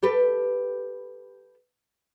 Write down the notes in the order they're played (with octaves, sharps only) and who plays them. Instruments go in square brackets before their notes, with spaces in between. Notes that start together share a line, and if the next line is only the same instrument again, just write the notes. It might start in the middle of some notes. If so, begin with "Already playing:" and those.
[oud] G4 A4 B4